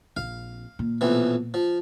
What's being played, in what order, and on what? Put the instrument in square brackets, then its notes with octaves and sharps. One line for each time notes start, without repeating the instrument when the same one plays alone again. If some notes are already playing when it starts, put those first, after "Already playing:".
[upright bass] A#1 C4 [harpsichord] F5
[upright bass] A#2
[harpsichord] B1 F2 E3
F3